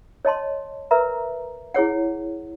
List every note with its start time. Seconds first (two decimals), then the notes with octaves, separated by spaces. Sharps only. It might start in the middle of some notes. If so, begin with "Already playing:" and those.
0.25 C#5 D#5 A5 C6
0.91 A#4 B4 E5 A#5
1.74 E4 G#4 C#5 F#5